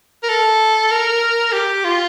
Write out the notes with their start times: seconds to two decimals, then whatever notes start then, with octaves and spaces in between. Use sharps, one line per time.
0.23 A#4
0.29 A4
0.91 A#4
1.53 G4
1.84 F4